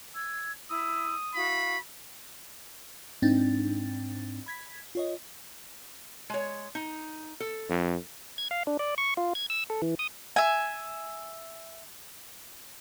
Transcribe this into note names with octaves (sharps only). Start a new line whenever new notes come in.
E6 G#6
E4 B5 D#6 E6
E4 F#4 F5 B5
G#2 C4 D4 D#4 G5 A6
B5 G#6 B6
F4 C#5 D#5
G#3 C#5
D#4
A4
F2
G#6
F5
D4
D5
C#6
F4
G#6
E6
A4
E3
D#6
E5 G#5